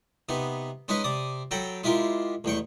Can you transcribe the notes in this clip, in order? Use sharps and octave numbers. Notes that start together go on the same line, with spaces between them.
C3 B3 D#4
G#3 C#4 D#4 G#4 B4 D#5
C3 D5 D#6
F#3 A4 G5 A#5 B5
G#3 E4 F4 G4 A#4
A1 E2 G5 C#6